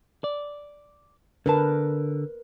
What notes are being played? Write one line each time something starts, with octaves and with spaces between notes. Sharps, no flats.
D5
D3 A#4 B4 A5